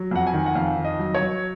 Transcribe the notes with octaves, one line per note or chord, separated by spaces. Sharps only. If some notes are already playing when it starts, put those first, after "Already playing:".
Already playing: F#3
F2 F#5
G#5
D#3
F#5
F2 F5
D#3
D#5
F#3
C#5
F#3